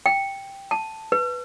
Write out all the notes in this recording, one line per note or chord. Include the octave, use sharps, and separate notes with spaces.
G5
A5
B4